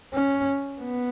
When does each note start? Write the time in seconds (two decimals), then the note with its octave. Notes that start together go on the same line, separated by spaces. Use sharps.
0.14 C#4
0.81 B3